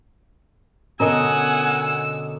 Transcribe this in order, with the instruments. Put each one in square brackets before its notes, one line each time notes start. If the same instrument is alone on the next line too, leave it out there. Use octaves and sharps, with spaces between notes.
[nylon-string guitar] B2 D3 C#4 [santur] A#4 D#5 [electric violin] F#5 G#5 [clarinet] E6